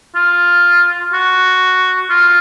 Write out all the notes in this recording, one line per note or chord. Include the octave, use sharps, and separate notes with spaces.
F4
F#4
F4